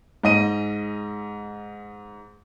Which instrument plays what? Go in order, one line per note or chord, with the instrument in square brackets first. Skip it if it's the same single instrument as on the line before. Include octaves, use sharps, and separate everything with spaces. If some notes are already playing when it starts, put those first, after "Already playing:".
[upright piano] G#2 D#5 D#7